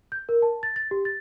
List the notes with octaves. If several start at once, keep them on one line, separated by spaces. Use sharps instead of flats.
G6
A#4
A5
A6
A6
G4
A6